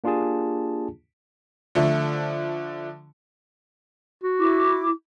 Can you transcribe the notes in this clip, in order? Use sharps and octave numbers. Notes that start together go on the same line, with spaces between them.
A#3 D4 F4 G4 G#4 A5
D3 F3 A3
F#4
E4 D6